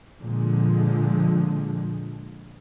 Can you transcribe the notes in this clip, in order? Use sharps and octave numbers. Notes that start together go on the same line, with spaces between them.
A#2 D3 F3 G#3